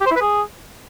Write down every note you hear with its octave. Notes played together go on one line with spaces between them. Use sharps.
G4
C5
E4
B4
G#4